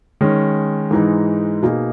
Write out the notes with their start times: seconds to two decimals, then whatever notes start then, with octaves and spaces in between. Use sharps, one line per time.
0.21 D#3 G#3 C#4
0.91 G#2 E3 G#3 D#4
1.63 B2 A#3 D#4 G#4